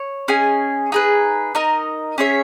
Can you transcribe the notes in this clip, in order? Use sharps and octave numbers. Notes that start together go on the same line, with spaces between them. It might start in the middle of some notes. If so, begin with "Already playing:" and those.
Already playing: C#5
C#4 G#4 D#5 G#5
D#4 G#4 B4
D#4 A#4 D#5
C#4 G#4 C#5 E5